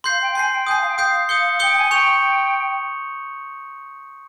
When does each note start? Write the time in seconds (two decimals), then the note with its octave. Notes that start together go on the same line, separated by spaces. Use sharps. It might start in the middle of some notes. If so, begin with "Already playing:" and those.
0.04 F5 C6 G6 C7
0.19 G5
0.35 G#5 C6 G6 C7
0.51 G5
0.66 G#5 D#6 G6 C7
0.77 F5
0.87 G5
0.98 F5 D#6 G6 C7
1.29 D#6 G6 C#7 G7
1.59 G5 D#6 G6 C#7 G7
1.75 G#5
1.90 G5 C#6 G6 C#7 F7